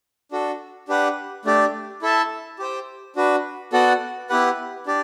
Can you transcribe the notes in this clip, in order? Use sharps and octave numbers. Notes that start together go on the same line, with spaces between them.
D4 F#4 A4
D4 G4 B4 F#5
A3 D4 G4 D5
E4 A4 E5 A5
G4 C5 G5
D4 F#4 B4
B3 F#4 A4 D5 F#5
B3 E4 G4 B4 F#5
D4 G4 D5